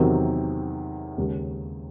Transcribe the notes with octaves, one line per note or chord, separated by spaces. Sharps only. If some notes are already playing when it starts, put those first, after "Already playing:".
Already playing: E2 C3 D#3 F#3 C4
D#2 C#3 G#3